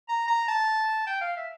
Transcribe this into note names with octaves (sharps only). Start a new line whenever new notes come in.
A#5
A#5
A5
G5
F5
E5